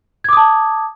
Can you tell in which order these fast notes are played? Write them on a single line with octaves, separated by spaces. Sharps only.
G#6 D6 D#6 A5